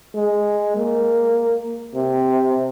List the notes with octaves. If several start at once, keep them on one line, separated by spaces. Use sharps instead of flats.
G#3
A#3
C3